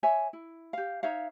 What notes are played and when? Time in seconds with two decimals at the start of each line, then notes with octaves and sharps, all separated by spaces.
0.03 C#5 E5 G#5
0.33 E4
0.73 G4 F5
1.03 D#4 C#5 E5 F5